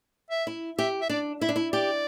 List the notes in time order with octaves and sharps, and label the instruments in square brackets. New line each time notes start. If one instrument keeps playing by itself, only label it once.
[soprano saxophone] E5
[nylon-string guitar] E4
[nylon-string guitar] G4 [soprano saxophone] E5
[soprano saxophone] E5
[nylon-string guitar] D4 [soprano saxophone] D5
[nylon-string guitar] E4 [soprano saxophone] E5
[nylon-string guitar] D4
E4
[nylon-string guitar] G4 [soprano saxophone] D5